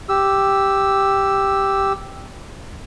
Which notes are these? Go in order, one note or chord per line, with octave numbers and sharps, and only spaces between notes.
G4 E6